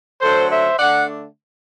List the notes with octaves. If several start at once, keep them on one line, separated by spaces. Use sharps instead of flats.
D3 F#3 A3 D4 A4 C5
C5 E5
D3 A3 D4 D5 F#5